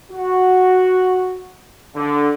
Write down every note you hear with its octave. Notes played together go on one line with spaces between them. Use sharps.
F#4
D3